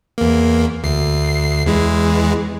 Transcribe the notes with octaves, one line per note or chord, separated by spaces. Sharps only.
E2 A#3
D2 C7
E2 E3 G#3